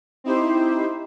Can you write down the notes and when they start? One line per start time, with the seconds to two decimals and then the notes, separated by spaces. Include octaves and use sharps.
0.24 C4 D#4 E4 G4 C5